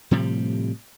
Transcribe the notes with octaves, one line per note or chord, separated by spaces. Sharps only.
A2 C3 F3 G3